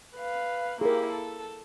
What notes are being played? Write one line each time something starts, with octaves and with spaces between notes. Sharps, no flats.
B4 F5
A#3 E4 G4 G#4 A#4
A4